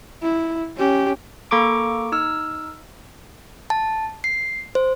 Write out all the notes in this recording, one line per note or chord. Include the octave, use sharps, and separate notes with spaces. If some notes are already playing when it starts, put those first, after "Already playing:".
E4
C#4 G4
A#3 A4 A#5 C#6 D6 D7
D#4 E6 F6
A5
C7
C5